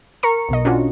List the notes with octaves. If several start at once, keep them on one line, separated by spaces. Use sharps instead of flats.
A#4 A#5 C#6 C#7
B1 B2 D#5
C#4 D4 F4 F#4